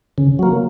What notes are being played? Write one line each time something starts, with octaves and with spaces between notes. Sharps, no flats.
C#3
F#3 A#3